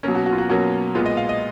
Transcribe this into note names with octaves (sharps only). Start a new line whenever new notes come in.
B2 F#3 A#3 C#4 A#4
F#4
F#4
F4
F#4
B2 F#3 A#3 C#4 F#4
A#2 G#3 B3 F4
D#5
F5
D#5